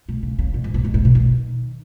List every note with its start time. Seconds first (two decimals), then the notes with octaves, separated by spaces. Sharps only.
0.09 B2
0.23 C#3
0.39 C#3
0.54 B2
0.64 G#2
0.74 B2
0.85 B2
0.94 G#2
1.05 B2
1.15 D#3